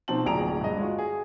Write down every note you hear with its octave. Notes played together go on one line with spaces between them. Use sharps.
B2 F3 C4 D#4 A5 F#7
D1 A#1 G#4 A#5 D7 F7
G2 D#5
G#3 F4 F#4
G#4